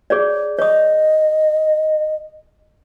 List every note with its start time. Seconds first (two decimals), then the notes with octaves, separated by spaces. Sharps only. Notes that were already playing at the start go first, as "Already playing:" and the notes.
0.10 G#4 C#5 D5
0.59 C#5 D#5 D#6